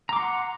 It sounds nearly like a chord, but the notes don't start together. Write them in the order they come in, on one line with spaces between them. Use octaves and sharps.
A#5 D6 C6 F#5